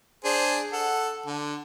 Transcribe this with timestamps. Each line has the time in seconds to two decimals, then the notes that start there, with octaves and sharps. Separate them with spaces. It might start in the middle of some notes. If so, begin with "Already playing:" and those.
0.24 D4 G#4 C5
0.73 A4 F#5
1.26 D3